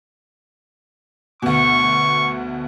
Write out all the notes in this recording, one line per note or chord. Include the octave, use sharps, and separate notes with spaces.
D2 B2 C#6